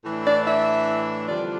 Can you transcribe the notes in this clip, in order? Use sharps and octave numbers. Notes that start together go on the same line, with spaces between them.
A2 E3 A3 D4
D5
E5
F2 D3 G3 D4 F4 D5